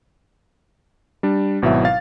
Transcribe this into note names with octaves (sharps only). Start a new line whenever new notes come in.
G3 D4
G#1 B2 F#3 E4 E5
F5 A6